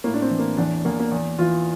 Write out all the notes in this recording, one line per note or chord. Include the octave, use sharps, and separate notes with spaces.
A2 A#3
D4
C4
E3
A#3
E2 D4
E2 A#3
A#3
E2
E3 F4